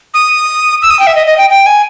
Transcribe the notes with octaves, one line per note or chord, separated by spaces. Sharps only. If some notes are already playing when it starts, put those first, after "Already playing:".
D#6
E6
D#6
G5
E5
D#5
D#5
G5
G5
G#5